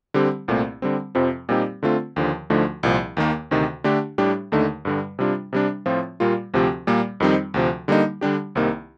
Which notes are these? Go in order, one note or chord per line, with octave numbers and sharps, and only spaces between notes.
D3 G3 C4 G4
C2 A#2 A3 C4
D3 G3 C4
F2 C3 F3 C4
A#2 G3 C4 D#4 G4
D3 A3 C4 F4
D#2 D3 F3
D2 D3 F3 A3 D#4
C2 A#2 F3
D#2 D#3 A#3
D2 C3 D#3
D3 A3 D4 G4
A2 G3 D4 G4
D#2 D3 A3 D#4
G2 D3 G3
C3 G3 D4 F4
C3 G3 D4
A2 F3 C4 F4
A#2 G3 A#3 F4
D2 C3 F3 C4 G4
A#2 G3 A#3
F2 D#3 G3 C4 D#4
D2 C3 F3
D3 G3 A#3 D#4
D3 G3 D4 G4
C2 C3 D#3 A#3 D#4